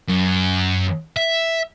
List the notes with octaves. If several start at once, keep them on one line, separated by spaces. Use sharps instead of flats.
F#2
E5